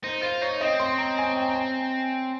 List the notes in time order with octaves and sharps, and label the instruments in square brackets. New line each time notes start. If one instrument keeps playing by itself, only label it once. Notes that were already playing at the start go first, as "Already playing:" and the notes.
[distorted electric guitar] D#4 [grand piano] C5
[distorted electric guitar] F4 [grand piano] C5
[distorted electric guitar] D#4 [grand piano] C#5
[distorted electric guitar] C4 [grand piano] D#5
[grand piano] C6
A#5
G#5
G5
A#5
G#5